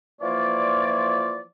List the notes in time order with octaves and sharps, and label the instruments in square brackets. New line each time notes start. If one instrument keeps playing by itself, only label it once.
[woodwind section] E3 F3 A#3 F4 C#5 D5